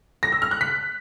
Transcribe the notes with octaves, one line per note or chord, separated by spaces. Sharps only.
A#6
E6
F6
F#6
B6